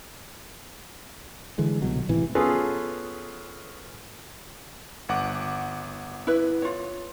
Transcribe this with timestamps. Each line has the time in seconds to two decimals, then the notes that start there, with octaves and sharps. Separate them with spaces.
1.58 D3 E3 G#3
1.82 C2 B2 F#3
2.09 G#1 A2 C3 E3
2.35 B3 C#4 F4 G#4 A4 B4
5.09 G1 F#5 D6
6.27 E4 B4
6.62 F4 C#5